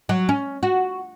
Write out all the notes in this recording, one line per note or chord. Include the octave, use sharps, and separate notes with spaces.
F#3
C#4
F#4